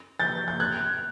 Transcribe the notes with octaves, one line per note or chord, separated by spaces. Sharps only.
G6 A6
G6
F#6 G#6